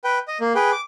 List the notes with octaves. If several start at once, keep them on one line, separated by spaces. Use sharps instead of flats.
B4 G5
D#5
A#3
G#4 B4 G5
D6